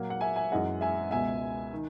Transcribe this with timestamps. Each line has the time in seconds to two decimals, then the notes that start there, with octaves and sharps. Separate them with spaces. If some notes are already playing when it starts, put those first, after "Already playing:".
Already playing: A#2 F#3 A#3
0.10 F#5
0.21 E5 G#5
0.36 E5 G#5
0.52 F#2 E3 G#3 D#5 F#5
0.81 E5 G#5
1.11 C#2 B2 G#3 E5 G#5
1.73 D#3